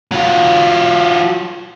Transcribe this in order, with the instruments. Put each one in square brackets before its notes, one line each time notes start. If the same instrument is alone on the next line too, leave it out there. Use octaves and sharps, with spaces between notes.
[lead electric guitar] F#3 F4